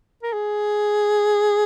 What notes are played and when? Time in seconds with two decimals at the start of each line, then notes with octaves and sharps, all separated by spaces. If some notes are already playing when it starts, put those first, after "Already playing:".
0.23 A#4
0.33 G#4